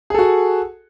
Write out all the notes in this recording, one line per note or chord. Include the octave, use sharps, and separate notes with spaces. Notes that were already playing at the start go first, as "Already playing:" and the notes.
F#4 G#4 A4